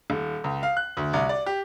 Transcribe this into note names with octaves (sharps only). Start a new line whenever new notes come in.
D#1
C#2
F5
F#6
D2
C2
D5
G4